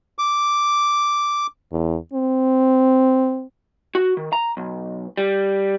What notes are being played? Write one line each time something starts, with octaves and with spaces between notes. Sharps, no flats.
D6
E2
C4
F#4
D#3
A#5
B1
G3